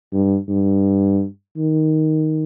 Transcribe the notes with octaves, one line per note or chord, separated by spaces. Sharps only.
G2
G2
D#3